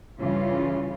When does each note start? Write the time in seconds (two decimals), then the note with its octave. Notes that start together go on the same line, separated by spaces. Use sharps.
0.18 G2 C#3 E3 G3 F4